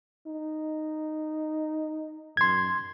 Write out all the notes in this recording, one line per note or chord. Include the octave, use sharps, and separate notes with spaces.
D#4
F#2 C6 G#6